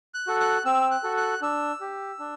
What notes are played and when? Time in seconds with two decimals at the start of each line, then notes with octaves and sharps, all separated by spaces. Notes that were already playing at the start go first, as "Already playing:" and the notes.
0.14 F#6
0.27 F#4 A4
0.40 F#6
0.65 C4 E6
0.91 F#6
1.03 F#4 A4
1.17 F#6
1.42 D4 E6
1.80 G4
2.19 D4